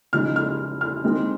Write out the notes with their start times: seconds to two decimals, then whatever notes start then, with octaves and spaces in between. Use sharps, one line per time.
0.13 C#3 F3 G#3 D#4 F6
0.36 F6
0.81 F6
1.04 D#3 G#3 C4 D#4